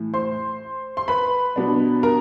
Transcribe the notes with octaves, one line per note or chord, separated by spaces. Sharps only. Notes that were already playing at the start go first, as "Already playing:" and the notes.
Already playing: A2 E3
C5 C6
C6
B4 B5
B2 F#3 B3 D4
A#4 A#5